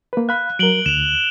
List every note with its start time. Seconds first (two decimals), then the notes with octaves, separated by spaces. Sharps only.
0.13 A#3 B4
0.29 F5 B5 F#6
0.59 F#3 A#4 D7 F#7 G7
0.86 D2 E7 F7